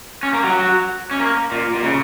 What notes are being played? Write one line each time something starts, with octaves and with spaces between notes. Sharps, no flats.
C#4
A#3
F#3
C#4
A#3
A#2
A#2
C#3